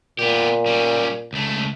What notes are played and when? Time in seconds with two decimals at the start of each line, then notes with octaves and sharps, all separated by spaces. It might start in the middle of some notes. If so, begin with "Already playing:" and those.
0.19 A#2 B3 G4
0.66 G3 C#4
1.33 C#2 A3